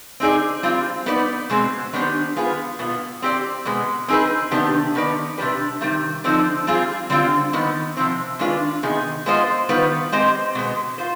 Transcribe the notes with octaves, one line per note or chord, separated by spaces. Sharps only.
C4 D#4 G#4 D5
G3 C4 F4
B3 D#4 B4 D5
B2 G#3 C4
D#3 B3 D4 G4 C5
G#3 B3 F4 G#4 B4
B2 B3 F4
C4 G4 D5
B2 G#3 B3
C4 D#4 G#4 B4
C3 D#3 B3 D4 G4
D#3 B3 D#4 B4 D5
C3 G3 D4 G4 B4
C3 D#3 G3
D3 F3 C4 D#4
G3 C4 F4 G#4
D3 G3 C4 F4
D#3 B3 D#4 B4
C3 F3 C4
D#3 G#3 D4 F4 B4
C3 D#3 B3 D#4 G#4
G#3 B3 F4 C5 D#5
D#3 G3 B3 F4 B4
G#3 C4 G4 C5 D#5
B2 G#3 B3
F4 C5